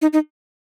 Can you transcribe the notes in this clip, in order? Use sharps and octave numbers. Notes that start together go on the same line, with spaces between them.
D#4
D#4